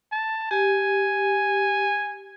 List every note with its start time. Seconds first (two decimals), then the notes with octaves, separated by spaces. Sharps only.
0.12 A5
0.51 G4 G#5